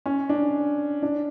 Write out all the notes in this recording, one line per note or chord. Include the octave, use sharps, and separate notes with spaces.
C#4
D4
D4